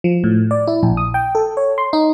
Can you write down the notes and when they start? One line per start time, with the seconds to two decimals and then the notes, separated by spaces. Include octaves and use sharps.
0.04 F3
0.24 A2
0.51 D5
0.67 E4
0.83 A#1
0.97 D#6
1.14 G5
1.35 A4
1.57 C#5
1.78 C6
1.93 D#4